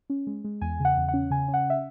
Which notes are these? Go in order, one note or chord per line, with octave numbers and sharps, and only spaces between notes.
C#4
G#3
G#3
E2 G#5
C#3 F#5
E2
F#5
C#4
C#3 G#5
C#4
F#5
E5